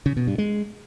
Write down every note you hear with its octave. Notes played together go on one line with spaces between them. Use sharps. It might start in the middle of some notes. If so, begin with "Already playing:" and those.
C#3
B2
G2
G#3